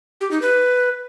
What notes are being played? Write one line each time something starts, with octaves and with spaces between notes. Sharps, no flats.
G4
D#4
B4